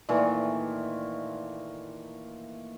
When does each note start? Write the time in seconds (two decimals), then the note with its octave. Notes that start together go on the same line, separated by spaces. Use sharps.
0.09 A#2 D#3 E3 A3